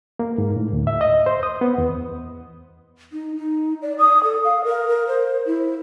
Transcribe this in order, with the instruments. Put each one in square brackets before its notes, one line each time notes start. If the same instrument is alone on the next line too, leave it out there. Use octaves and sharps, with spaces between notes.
[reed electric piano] A#3
G#2
A2
D2
E5
D#5
C5
D#6
B3
E2
[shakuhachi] D#4
D#4
D5
D#6
A4
F5
A#4
A#4
C5
E4